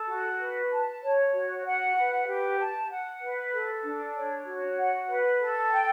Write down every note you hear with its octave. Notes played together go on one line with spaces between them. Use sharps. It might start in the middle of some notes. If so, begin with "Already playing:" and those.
Already playing: A4
F#4
B4
A5
C#5
F#4
F#5
B4
G4
A5
F#5
B4
A4
D4
C#5
F#4
F#5
B4
A4
G5